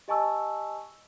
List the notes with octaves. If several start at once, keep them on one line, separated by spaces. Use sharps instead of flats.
G4 D#5 G#5 A5 C#6 E6